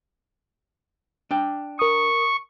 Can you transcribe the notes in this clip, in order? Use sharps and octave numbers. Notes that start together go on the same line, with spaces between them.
D4 G5
A#4 C#6 D#6